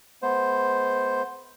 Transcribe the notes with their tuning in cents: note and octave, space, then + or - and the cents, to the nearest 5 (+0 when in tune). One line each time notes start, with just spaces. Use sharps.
G#3 +45 B3 +0 C5 +0